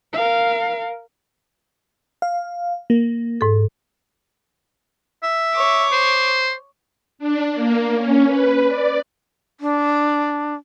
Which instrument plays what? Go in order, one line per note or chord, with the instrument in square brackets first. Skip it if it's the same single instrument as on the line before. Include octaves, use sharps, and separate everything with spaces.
[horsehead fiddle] A#4 F5
[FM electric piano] F5
A#3
[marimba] G#2 A4
[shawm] E5
[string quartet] C#5 D6
[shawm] C5
[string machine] D4
A#3
C#4
B4
D5
[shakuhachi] D4